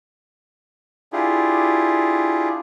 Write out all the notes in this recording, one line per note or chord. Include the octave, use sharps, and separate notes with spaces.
D4 E4 F4 G4 G#4